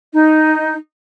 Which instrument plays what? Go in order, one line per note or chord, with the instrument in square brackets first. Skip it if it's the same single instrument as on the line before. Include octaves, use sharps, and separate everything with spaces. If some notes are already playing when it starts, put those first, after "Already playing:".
[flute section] D#4